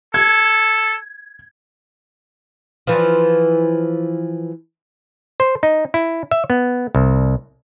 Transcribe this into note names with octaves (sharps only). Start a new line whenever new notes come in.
A4 G#6
E3 F3
C5
D#4
E4
E5
B3
C2